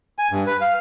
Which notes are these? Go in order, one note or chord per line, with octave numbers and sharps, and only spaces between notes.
G#5
G2
B4
F5